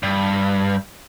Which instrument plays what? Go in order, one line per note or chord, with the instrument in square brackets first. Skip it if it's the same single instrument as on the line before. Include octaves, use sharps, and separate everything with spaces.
[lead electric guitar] G2